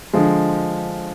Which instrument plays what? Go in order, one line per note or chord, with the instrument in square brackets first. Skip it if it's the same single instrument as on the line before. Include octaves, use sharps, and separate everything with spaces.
[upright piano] D3 F3 G#3